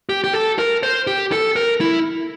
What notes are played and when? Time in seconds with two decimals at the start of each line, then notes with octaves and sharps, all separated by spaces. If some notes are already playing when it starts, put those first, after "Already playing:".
0.09 G4
0.24 G4
0.34 A4
0.59 A#4
0.83 C5
1.07 G4
1.32 A4
1.56 A#4
1.81 E4